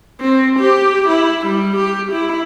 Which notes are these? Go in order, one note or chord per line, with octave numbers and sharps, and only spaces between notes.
C4
G4
E4
G3
G4
E4